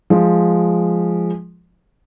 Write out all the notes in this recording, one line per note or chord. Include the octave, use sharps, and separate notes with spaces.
F3 G#3